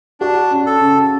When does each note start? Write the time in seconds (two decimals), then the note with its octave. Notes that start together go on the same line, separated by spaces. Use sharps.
0.21 D4 F#4
0.51 C#4
0.66 A4
0.81 C#3